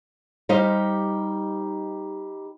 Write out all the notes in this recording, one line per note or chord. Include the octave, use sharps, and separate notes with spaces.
G3 D#4 G4 C5 D#5 F5